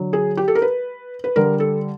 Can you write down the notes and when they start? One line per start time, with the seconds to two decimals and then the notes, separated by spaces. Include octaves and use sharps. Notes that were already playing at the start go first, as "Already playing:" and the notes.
Already playing: D3 F#3
0.13 G#4
0.37 G4
0.48 A4
0.55 A#4
0.62 B4
1.24 B4
1.36 D3 G3 A#4
1.60 A4